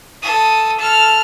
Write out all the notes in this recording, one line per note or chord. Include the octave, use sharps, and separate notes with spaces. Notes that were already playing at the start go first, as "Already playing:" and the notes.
A4 D#6
A4 F6